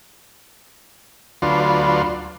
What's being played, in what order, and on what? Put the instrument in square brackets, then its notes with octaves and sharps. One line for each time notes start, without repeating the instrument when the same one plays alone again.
[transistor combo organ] D2 F#3 D4 F4 B4 C6